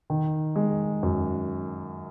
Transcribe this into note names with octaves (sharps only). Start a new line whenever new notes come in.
D#3
G#3
F#2